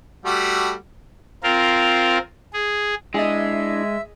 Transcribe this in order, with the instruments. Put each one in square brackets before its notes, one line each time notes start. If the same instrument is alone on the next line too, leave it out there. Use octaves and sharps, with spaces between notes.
[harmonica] G3 A3 F#4
[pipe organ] C4 F4 A#4
G#4
[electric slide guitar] G#3 [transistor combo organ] D4 E4 [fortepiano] G#4 D#5 [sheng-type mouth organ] E5